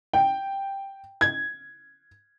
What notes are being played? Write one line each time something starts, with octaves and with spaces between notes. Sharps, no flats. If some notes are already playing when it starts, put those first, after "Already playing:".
G5
G#6